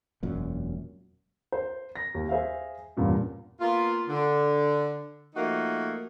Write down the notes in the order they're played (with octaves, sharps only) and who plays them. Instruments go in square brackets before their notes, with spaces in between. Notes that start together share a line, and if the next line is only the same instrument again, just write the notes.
[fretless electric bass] E1 F#2 A#2
[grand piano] C5
A#6
D#2
G#4 C5 E5 F5
E2 G2 A#2 C#3
[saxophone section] A#3 B3 F4
D3
F3 A3 A#3 D#4 F#4